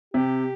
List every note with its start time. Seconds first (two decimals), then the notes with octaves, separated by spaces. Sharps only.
0.14 C3 G4